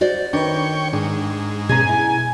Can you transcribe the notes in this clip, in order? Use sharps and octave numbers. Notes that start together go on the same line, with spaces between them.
F#4 C5 D5
D#3 D4 B4 C#5 G5
G#2 D4
B2 C#4 G#4 G#5 A#5
E4